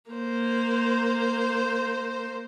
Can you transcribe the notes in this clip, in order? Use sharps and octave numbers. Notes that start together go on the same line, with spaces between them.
A#3 C5